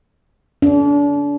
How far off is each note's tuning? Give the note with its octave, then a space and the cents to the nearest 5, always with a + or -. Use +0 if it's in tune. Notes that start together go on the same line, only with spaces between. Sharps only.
D4 -35